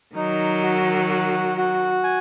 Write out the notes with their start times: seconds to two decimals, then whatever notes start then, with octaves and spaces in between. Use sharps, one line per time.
0.15 D#3 F#3 D#4
0.62 F#4
1.10 F#4
1.57 F#4
2.04 G#5